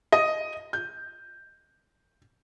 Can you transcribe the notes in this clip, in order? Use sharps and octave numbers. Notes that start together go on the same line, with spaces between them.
D#5
G6